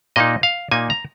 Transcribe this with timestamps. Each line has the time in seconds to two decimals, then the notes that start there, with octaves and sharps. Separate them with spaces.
0.16 A#2 A#3 D#4 D#5
0.43 F5
0.71 A#2 A#3 D#4 G#5
0.90 A#5